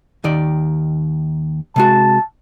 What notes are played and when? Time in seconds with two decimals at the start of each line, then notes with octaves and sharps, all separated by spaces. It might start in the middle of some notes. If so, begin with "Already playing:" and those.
0.24 D#2 D#3 D5
1.76 C3 G#3 F#4 A5